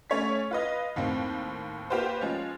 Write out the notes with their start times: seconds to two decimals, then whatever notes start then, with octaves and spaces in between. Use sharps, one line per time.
0.10 A3 C#4 C#5 G#6 B6
0.51 F4 B4 D#5
0.96 D#2 A2 A#3 C4
1.90 A#3 F4 G4 B4 C5
2.21 F3 G#3 C#4